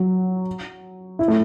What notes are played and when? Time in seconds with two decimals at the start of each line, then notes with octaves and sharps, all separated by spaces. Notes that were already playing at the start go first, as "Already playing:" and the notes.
Already playing: F#3
1.19 E4
1.28 A3